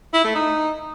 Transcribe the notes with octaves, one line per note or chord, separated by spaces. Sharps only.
E4
A3
D#4